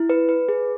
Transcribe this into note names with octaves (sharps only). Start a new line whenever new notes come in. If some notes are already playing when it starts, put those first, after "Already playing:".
Already playing: E4
B4
B4
G#4